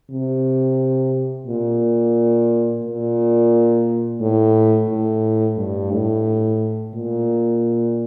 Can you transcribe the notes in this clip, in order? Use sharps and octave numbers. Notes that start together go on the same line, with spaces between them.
C3
A#2
A#2
A2
A2
G2
A2
A#2